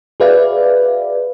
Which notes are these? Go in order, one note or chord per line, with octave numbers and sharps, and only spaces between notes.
F#4 G#4 B4 D5 E5 F5